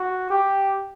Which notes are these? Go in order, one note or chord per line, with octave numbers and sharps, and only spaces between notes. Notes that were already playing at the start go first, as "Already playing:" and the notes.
Already playing: F#4
G4